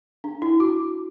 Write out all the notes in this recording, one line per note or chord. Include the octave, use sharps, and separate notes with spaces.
D4
E4
F#4